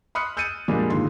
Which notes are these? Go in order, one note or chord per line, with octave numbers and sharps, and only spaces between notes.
B5 C6 D#6 F6 F#6 C#7
E6 G6 A6 C#7 D#7
F2 A#2 G3 G#3 A#3 D4
D#2 G#2 D3 F3 C6